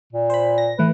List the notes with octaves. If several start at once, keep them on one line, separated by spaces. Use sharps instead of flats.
A#2
C5 B5
A#6
A2 E3 B4